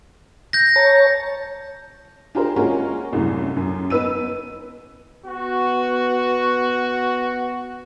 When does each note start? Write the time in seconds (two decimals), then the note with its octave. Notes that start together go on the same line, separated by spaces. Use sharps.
0.53 G6 A#6
0.76 C#5 A5 A#5
2.35 D4 F4 G4 G#4 A#4 C5
2.56 G#3 A#3 C#4 F4 F#4 A#4
3.13 C2 F#2 A2
3.57 F#2
3.90 B3 D#4 B4 E6 D#7
5.26 B3 F#4